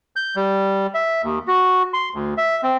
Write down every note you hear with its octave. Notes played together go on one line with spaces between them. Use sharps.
G6
G3
E5
D#2
F#4
C6
D2
E5
C4